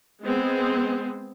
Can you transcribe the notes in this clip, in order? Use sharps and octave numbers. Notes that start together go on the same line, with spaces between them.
G#3 B3 C4